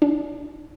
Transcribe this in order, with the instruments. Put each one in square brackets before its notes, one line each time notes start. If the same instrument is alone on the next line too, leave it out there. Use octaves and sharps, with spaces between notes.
[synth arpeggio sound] D4